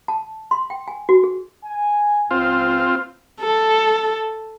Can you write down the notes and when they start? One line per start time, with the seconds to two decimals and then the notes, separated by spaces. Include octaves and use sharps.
0.08 A5
0.51 C6
0.70 G5
0.88 G#5
1.09 F#4
1.24 G#4
1.64 G#5
2.31 C#2 C4 F4
3.42 A4